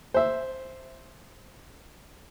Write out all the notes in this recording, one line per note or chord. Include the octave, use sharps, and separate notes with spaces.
C5 E5